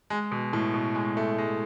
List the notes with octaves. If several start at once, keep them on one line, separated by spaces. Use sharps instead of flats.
G#3
B2
A2
B2
G#3
A3
G#3